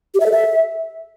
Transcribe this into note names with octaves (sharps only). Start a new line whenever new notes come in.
G4
E5
A4
E5